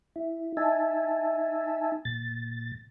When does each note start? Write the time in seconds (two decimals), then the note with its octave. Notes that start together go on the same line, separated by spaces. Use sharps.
0.16 E4
0.57 D#4 E5 G#5 A5
2.05 A#2 A6